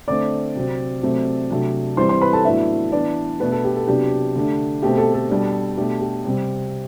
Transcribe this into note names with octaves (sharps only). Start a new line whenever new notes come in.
D3 A3 C4 D5 D6
C3 F#3 C4
C3 F#3 A3 C4
C3 F#3 A3 D4
E3 G3 C4 C5 C6
C5 C6
B4 B5
A4 A5
A2 F#3 B3 D4 E4 E5
E3 B3 D4 D5
B2 A3 B3 D4 B4
A4
G4
A4
C3 F#3 B3 D4 G4
D3 A3 D4
B2 A3 C4 G4
A4
A4
B2 G3 D4
B2 A3 D4 G4
G4
C3 G3 C4